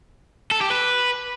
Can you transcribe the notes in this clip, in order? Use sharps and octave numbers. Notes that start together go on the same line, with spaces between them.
A4
G4
B4